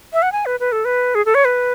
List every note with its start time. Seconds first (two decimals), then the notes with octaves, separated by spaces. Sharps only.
0.13 E5
0.22 F#5
0.32 G#5
0.46 B4
0.60 B4
0.72 A4
0.85 B4
1.15 G#4
1.26 A4
1.35 C#5
1.45 B4